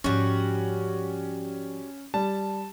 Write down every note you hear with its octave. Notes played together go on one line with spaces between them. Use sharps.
G#2 F3 G3 C#4 F#4
G3 A5